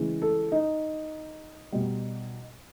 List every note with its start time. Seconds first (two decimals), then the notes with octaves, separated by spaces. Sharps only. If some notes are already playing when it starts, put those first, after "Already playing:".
Already playing: C#3 E3 G#3
0.22 A4
0.52 D#4
1.72 B2 G3